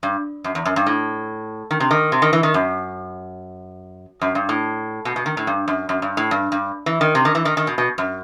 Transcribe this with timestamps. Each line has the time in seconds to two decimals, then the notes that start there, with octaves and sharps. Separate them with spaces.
0.03 G2
0.44 F#2
0.55 E2
0.65 F#2
0.76 G2
0.86 A2
1.71 D#3
1.80 C3
1.91 D#3
2.12 C3
2.22 D#3
2.33 E3
2.43 D#3
2.54 F#2
4.21 F#2
4.35 G2
4.49 A2
5.05 B2
5.16 B2
5.26 D#3
5.37 A2
5.47 G2
5.68 F#2
5.89 F#2
6.02 G2
6.17 A2
6.31 G2
6.52 G2
6.86 E3
7.01 D#3
7.15 C3
7.25 D#3
7.35 E3
7.45 D#3
7.57 D#3
7.67 B2
7.78 B2
7.98 F#2